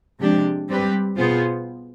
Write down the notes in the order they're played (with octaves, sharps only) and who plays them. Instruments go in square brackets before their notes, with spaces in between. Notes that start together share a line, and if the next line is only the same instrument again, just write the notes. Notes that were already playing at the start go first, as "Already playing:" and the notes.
[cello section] C3 F3 G#3 D4 G4
G3 C4 G4 B4
B2 B3 F4 G#4 C5